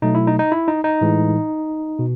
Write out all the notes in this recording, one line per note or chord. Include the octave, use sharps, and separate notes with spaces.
B2 F#3 A3 D#4
E4
D#4
D#4
E4
D#4
D#4
A2 E3 G#3
B2